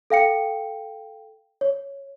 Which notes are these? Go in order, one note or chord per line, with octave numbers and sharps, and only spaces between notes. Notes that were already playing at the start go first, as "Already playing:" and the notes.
A4 F5 G5 C#7
C#5